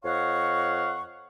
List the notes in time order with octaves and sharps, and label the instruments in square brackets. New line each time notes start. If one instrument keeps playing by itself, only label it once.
[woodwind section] F2 C#5 D#5 F5 F#5 C#6